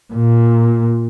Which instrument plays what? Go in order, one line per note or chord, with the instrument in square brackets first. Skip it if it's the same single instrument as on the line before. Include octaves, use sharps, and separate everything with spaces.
[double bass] A#2